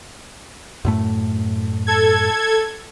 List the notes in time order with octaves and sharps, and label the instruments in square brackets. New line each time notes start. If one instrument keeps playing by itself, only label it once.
[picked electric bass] F#2 A2 A3
[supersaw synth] A4 G#6